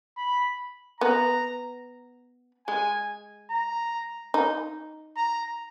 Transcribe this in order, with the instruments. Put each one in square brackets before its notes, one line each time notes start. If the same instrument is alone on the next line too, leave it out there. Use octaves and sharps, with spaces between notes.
[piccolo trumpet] B5
[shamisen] B3 [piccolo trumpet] A#5
[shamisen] G#3 [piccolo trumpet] G#5
[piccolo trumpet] A#5
[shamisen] D#4
[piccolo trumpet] A#5